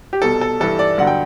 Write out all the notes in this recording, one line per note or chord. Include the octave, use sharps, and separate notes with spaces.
G4
C2 B2 G3 A4
A4
G2 E3 G3 A4
D5
G2 D3 F#3 F#5
G5